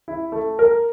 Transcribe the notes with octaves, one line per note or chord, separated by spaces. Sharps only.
E4
A3
A#4